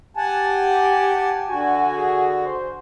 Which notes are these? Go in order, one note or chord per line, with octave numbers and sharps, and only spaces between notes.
G4 F#5 G#5 A5
D3 F#4 G#5
G#4
C5